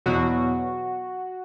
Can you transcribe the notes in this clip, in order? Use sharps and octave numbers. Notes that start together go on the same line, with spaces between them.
E2 B2 F#3 F#4